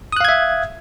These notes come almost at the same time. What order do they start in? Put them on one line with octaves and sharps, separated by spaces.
D#6 F#6 F5 G#6 E5